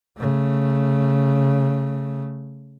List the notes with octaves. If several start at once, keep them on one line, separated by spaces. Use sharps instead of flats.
C#3 A3